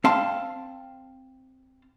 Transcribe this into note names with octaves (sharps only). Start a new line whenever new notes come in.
C4 F5 A5 C6